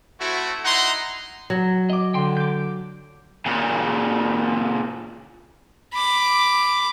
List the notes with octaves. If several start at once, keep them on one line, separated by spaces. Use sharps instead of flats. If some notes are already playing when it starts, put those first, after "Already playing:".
A3 C4 E4 F#4
D#4 E4 F#5 A#5 C6
F#3
D#5 D6
D3 G5 C6
D6 G6
A#2 C#3
B5 D6